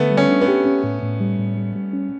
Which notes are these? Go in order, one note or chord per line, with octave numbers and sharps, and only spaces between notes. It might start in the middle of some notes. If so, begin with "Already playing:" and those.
Already playing: D3 A3 B3
G3
C#4
D4
B3
G4
C#4
A2
A2
G3
A2
G3
G3
C#4